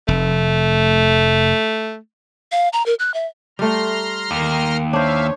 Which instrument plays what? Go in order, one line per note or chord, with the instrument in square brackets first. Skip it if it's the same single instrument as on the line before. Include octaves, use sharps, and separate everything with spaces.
[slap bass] F1 [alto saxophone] A3
[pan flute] F5
A#5
A#4
F#6
E5
[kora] G3 A3 [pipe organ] A#5 C6 F6
[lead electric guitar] D#2 [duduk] D#3
[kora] D4 C5 [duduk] C#5 [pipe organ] E5 F5